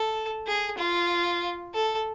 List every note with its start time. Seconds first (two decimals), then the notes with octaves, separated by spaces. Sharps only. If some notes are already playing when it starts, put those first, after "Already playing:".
Already playing: A4
0.47 G#4
0.78 F4
1.75 A4